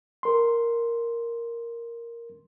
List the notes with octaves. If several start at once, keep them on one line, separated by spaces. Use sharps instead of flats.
A#4 C6